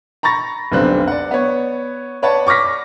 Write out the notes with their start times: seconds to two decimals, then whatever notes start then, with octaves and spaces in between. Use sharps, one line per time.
0.23 A#5 B5 C#6 A6 A#6
0.72 F1 B1 D3 C4 D4 F#6
1.08 D5 F#5
1.31 B3 C#5
2.22 B4 C#5 D5 F#5 A5
2.47 C#6 D6 F6 A#6 B6